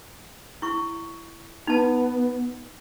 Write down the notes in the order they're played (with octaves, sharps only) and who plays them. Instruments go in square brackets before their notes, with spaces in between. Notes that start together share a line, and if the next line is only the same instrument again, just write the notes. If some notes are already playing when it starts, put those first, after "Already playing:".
[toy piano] E4 C#6
[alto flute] B3 [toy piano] D#4 A5